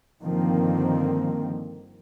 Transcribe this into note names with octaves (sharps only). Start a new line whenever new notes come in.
G2 D3 D#3 F3 A#3 C4